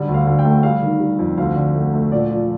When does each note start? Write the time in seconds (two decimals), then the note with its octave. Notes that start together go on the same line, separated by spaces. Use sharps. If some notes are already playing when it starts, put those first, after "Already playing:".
Already playing: D3 G3
0.08 D2
0.14 F5
0.27 D2
0.39 G5
0.45 A3
0.63 G3 F5
0.83 D#3
1.00 G3
1.19 F2
1.38 D2 F5
1.56 D3
1.75 A3
1.93 A3
2.12 A#2 D5
2.31 F3